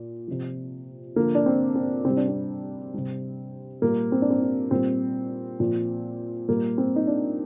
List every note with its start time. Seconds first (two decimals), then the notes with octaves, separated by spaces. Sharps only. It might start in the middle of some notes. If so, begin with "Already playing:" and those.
Already playing: A#2
0.28 C3 F3
1.16 D3 F3 A#3
1.35 D4
1.46 C4
1.75 C4
2.05 C3 G3 C4
2.17 D4
2.28 C4
2.94 C3 G3
3.82 A#2 G3 A#3
4.12 C4
4.22 D4
4.30 C4
4.42 D4
4.71 A#2 G3 C4
5.60 A#2 F3
6.48 A#2 G3 A#3
6.78 C4
6.96 D#4
7.07 D4